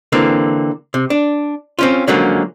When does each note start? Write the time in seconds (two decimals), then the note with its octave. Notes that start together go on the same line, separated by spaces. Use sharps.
0.12 D3 E3 A#3 C4
0.94 C3
1.10 D4
1.79 C4 C#4 F4
2.08 D3 F3 F#3 G#3 A#3 C#4